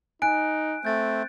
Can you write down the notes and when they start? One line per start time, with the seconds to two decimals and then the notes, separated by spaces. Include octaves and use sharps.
0.22 D#4 G#5 F#6 D7
0.85 A3 C4 G6 A6